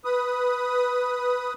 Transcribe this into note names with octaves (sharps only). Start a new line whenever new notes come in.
B4 D#6